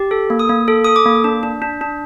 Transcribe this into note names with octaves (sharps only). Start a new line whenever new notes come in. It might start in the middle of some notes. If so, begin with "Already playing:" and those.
Already playing: G4
A4
A#3
D#6
A#3
A4
A4 D#6
D6
A#3
D4
D4
D4
D4